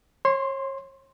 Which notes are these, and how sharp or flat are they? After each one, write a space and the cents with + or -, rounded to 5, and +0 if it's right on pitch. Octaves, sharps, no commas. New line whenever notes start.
C#5 -35 C6 +0